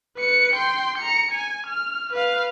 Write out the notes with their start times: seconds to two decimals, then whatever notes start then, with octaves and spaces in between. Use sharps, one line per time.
0.18 B4 C#7
0.54 G5 C6
0.98 A#5 C#7
1.31 G#5
1.67 F6
2.13 B4 F5